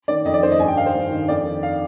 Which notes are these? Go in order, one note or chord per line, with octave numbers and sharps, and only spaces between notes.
D#3 D5
F2 D#5
D5
D#3 C5
D#5
G2 G#5
G5
D#3 F5
C5
G2
D#3
F2 D5
D#3
F5